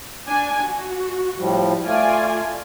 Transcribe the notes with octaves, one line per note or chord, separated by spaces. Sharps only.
D4 G#5
F#4
A2 F3 G3
A3 F4 D5 G#5